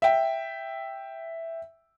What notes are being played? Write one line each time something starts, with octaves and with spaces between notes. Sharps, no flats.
E5 G5